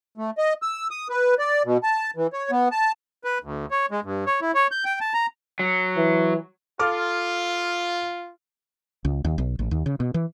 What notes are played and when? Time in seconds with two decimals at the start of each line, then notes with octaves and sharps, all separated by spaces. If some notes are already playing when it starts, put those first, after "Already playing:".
0.18 A3
0.38 D#5
0.62 E6
0.91 D#6
1.10 B4
1.39 D5
1.65 B2
1.83 A5
2.16 E3
2.33 C#5
2.51 B3
2.71 A5
3.24 B4
3.43 D2
3.71 C#5
3.91 G#3
4.04 G2
4.27 C#5
4.41 E4
4.55 C#5
4.71 G6
4.85 G5
5.01 A5
5.14 A#5
5.59 F#3
5.97 E3
6.79 F4 A4 D6 F6
9.05 C#2
9.25 D#2
9.38 B1
9.59 A1
9.71 D#2
9.86 C#3
10.00 B2
10.14 E3